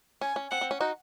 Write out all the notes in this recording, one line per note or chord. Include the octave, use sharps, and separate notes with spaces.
C#4 G#5
C#4
C4 F#5
C4
C#4
D#4 F#4